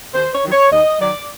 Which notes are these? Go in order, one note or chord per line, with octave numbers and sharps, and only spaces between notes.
D#2 C5
C#5
D#3 F#3
C#5
D#2 D#5
D#3 F#3 D5